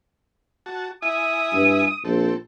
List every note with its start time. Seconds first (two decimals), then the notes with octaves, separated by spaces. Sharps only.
0.66 F#4 A5
1.02 E4 E5 G#5 D#6
1.53 G2
2.05 A#1 C4 A4